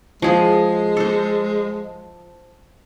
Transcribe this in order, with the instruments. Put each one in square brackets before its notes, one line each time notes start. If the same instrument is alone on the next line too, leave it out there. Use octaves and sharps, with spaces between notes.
[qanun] F3 G#4 [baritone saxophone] G#3
[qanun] A4 C5